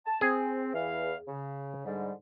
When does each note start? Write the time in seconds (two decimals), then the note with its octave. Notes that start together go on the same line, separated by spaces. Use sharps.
0.06 A5
0.21 C4 G#4
0.74 E2 E3 F5
1.28 C#3
1.85 G#2 D3 G3